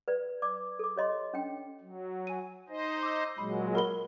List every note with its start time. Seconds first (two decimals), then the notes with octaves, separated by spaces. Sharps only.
0.08 B4 D5
0.42 D5 D6
0.79 A4 D6
0.96 G4 C#5 D#5 C6
1.34 C#4 D4 G5
1.80 F#3
2.27 G#5 D#7
2.69 D#4 C5 D#5
3.03 D6 E6
3.38 A#2 F#3 G#3 B5
3.75 A#4 B5 G7